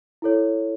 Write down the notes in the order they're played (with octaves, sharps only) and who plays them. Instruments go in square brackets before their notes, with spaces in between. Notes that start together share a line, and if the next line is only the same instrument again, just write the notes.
[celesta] E4 A4 C#5